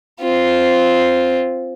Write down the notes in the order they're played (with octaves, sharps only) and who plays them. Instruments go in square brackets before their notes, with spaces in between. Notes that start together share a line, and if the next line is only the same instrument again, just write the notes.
[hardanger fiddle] C4 F4